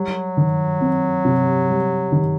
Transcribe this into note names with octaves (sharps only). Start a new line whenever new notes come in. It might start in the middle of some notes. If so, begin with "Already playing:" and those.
Already playing: F#3 G3
D#3
C4
C3
G3
D#3